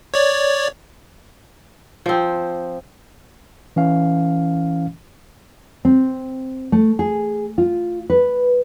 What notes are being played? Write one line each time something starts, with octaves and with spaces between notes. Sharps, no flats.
C#5 D5
F3 C4
E3 C#4 F5
C4
A3
G#4
F4
B4